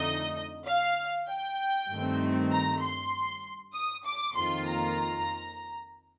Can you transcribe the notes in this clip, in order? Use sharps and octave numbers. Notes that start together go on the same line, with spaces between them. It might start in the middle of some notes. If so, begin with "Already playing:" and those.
Already playing: F2 D3 A3 D#4 D#5
F5
G5
G2 D#3 A3 C4
A#5
C6
D#6
D6
F2 D#3 A#3 F4 C6
A#5